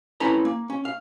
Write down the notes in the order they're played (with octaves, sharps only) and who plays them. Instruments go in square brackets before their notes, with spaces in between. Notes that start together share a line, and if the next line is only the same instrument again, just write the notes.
[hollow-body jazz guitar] C4 C#4 E4 A4 B4 A#5
A#3
C#4
F5